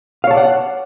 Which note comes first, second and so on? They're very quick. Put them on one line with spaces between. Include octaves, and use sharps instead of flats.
F5 C#5 A5 D5 F#5